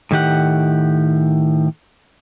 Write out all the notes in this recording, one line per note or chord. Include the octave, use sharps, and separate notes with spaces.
A2 D#3 G4 F#5